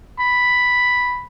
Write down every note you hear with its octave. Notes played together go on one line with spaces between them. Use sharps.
B5